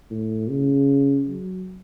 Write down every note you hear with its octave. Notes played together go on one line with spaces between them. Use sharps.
A2
C#3
F#3